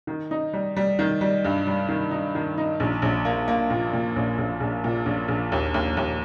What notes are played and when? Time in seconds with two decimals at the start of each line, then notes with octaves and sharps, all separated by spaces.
0.07 D#3
0.31 D#4
0.53 G3
0.76 G3
0.99 D#3
1.21 G3
1.44 G2
1.67 G3
1.89 D#3
2.11 D#4
2.35 D#3
2.58 D#4
2.80 A#1
3.02 A#1
3.25 A#3
3.48 A#3
3.70 A#2
3.93 A#2
4.16 A#1
4.38 A#1
4.60 A#1
4.84 A#2
5.06 A#1
5.28 A#1
5.52 D#2
5.74 D#2
5.97 D#2